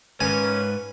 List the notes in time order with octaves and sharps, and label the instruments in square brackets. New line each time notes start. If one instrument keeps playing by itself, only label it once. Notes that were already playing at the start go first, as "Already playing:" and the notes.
[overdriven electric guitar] G#2 [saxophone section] C#3 A#3 C#4 [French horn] B4 [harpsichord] G#5